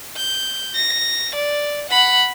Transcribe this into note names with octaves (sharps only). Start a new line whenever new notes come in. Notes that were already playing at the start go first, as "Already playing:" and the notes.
G6
A#6
D5
F#5 B5